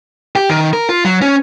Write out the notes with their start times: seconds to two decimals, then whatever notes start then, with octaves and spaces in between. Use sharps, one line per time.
0.36 G4
0.50 D#3
0.73 A#4
0.89 F4
1.05 F#3
1.21 C#4